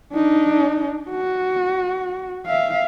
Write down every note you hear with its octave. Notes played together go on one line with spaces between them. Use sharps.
D4 D#4
F#4
E5 F5